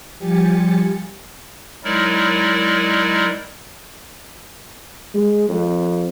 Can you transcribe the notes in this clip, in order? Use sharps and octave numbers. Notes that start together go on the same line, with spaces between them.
F3 G3 G4 G#5 A6 C#7
F#3 G#3 D#4 E4 A#4 D5
G#3
F2